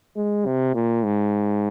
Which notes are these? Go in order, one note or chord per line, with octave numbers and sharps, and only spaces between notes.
G#3
C3
A#2
G#2